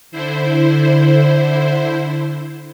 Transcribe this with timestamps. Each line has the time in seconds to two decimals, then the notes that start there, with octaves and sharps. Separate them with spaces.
0.11 D3 E4 C5